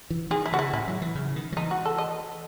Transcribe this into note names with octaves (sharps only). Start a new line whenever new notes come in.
E3
D#3 G#4
E4
C#3 F#4
E4
A2 E4
F#3
E3
C#3
D#3
F#3
E3 D#4
F#4
A4
D#5